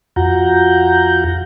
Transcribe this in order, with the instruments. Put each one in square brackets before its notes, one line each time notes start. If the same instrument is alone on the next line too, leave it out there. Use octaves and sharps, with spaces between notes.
[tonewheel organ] F2 F4 F#4 F#5 A#5 G6